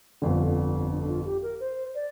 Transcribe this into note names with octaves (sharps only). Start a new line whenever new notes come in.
G1 F2 D3 C4
D4
F4
G4
A#4
C5
D5